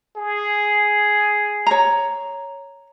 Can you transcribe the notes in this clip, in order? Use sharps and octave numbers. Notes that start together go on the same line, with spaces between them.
G#4
C#5 A#5